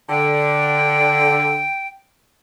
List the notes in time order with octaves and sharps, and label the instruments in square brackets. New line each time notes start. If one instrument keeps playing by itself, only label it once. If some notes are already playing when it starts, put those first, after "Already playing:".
[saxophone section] D3 [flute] G5